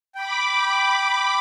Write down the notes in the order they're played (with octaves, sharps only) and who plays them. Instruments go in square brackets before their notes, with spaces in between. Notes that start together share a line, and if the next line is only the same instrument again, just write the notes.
[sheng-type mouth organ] G5 [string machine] B5 D6